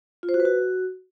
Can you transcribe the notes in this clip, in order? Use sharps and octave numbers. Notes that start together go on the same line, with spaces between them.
F4
C5
F#4
B4
F#4